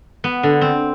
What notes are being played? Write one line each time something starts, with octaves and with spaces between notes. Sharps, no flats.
B3
D3
C4